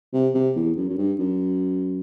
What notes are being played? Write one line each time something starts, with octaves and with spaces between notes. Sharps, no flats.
C3
C3
E2
F#2
F#2
G2
F#2